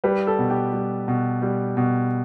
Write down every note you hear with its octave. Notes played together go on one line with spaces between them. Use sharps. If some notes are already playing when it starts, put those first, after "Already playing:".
G3 B4
A4
B2
G4
G3
B2
G3
B2